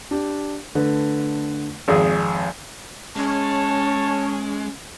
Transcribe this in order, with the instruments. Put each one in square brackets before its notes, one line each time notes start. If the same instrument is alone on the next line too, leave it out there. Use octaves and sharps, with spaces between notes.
[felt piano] D4 G4
D3 A3 B4
[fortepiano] G#1 F2 G#4 [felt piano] D5
[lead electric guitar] G#3 [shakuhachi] C#4 [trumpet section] C#5 A5